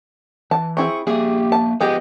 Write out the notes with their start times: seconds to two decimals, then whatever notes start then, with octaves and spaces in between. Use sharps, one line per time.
0.51 E3 A5
0.77 C4 E4 G#4 C#6
1.07 F3 A#3 G4 G#4 E5
1.52 A5
1.81 F3 G#3 B3 G4 G#4 D#5